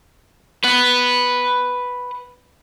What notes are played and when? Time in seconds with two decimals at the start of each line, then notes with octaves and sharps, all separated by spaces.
0.64 B4 F#5